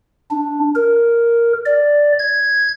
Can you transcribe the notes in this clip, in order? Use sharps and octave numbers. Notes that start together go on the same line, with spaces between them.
D4
A#4
D5
G#6